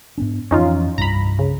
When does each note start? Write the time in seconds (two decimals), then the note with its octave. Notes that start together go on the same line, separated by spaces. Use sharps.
0.18 G#2 B3 D4
0.51 F2 E3 C#4 D#4 F4
0.98 C2 G2 A#5 B5
1.39 C#3